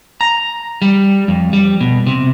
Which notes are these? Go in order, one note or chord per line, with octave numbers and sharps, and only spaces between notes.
A#5
G3
F2
G3
B2
C3